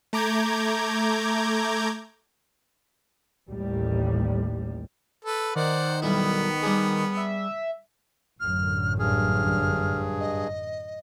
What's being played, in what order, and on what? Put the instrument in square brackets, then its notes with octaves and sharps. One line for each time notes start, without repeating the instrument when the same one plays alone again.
[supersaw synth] A3 A#5 D6 G6 G#6
[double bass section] A1 D#2 A2 G3
[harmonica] A4 B4
[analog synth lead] D#3 [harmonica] C5 D5 F#5
[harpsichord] B1 G3 E4 [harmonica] B3
[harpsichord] G3 D4 G#4
[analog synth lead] E5
[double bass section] A1 F#2 D3 [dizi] F6
[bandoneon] G2 G#4 [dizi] F6
[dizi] D#5